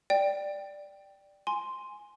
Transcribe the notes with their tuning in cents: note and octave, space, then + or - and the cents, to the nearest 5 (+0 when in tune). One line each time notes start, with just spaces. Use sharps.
D5 +0 G5 +0
G#5 +0 C6 +0